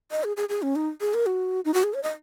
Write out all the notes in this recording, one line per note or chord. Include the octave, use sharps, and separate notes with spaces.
D#5
G#4
G#4
G#4
C#4
D#4
G#4
A#4
F#4
D#4
F#4
G#4
C#5
D#5